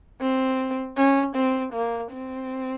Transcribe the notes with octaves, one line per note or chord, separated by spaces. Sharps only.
C4
C#4
C4
A#3
C4